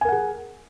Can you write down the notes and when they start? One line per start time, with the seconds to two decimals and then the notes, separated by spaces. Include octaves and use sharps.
0.01 G#5
0.05 A#4
0.09 F#5
0.12 G#4